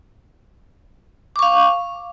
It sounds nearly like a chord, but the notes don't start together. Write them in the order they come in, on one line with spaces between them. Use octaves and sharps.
D6 C#6 F5